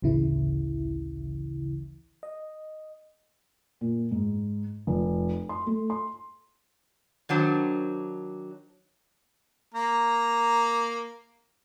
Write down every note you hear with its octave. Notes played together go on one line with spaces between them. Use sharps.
A1 D2 C#3 E3 E4
D#5
A#2
G#2
F1
C6
A3
C6
D#3 F#3 D4 C5
A#3 A#5